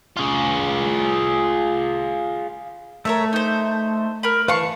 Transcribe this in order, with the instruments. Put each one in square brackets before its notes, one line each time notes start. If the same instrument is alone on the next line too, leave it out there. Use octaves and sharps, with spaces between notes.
[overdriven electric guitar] F4 G#4
[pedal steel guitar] A3 [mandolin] A#4 C#5 E5
[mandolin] D#4 C5
A#4 B5
[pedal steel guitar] E3 B4 [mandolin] F5 A5 C#6